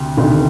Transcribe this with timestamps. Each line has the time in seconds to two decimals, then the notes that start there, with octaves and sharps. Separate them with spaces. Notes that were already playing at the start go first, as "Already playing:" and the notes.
Already playing: D2 C3
0.17 D2 C3 D#3